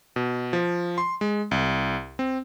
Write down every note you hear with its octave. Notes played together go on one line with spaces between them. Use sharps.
B2
F3
C6
G#3
C2
C4